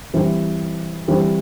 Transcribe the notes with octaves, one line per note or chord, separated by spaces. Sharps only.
E3 G3 C4 E4
E3 G3 C4 E4